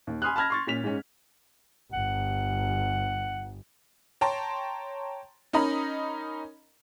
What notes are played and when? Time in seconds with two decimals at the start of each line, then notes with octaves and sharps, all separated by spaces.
0.07 D#2
0.22 G#5 B5 C6 D#6 F6 F#6
0.36 A5 B5 F6 G#6 A#6
0.50 C6 C#6 A6
0.67 A#2 C#4 B6 F7
0.83 G#2 C#4
1.93 G1 F#5
4.21 C#5 G5 A5 A#5 C6
5.53 C#4 D#4 A#4 D#5 A#5 B5